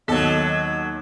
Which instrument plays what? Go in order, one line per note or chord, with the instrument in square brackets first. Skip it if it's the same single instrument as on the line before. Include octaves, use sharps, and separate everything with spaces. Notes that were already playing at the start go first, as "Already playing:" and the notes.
[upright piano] D#2 [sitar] F#3 A4 [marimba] B3 [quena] D#5